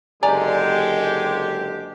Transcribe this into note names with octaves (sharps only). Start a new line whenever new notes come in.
F#1 D3 G#3 G4 D5 G#5 A#5